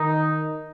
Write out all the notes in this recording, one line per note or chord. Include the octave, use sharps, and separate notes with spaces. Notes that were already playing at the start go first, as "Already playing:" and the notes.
Already playing: D#3 D#4